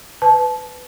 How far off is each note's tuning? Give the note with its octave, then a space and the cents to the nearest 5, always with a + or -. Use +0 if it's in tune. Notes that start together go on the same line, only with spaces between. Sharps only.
B4 +15 A5 -25